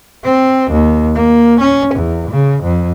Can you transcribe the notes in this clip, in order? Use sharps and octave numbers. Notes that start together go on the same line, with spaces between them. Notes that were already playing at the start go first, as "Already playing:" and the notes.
C4
D#2
A#3
C#4
E2
C#3
F2